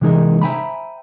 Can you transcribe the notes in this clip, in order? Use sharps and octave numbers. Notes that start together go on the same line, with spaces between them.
C3 E3 G#3 D#4 G#4 A#4
C5 E5 G5 G#5 A#5 B5